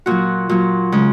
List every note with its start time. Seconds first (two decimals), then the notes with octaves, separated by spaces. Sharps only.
0.06 A#2 F#3 F#4
0.49 A#2 F#3
0.92 C#3 G#3